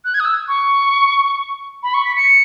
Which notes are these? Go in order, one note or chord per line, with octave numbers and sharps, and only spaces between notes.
F#6
G#6
D#6
E6
C#6
B5
C#6
B6
C#7